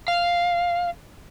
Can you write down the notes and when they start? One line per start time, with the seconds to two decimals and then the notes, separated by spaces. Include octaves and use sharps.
0.08 F5